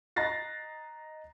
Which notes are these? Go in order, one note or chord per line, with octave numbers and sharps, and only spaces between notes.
D#5 A#5 F#6 A6 A#6 C7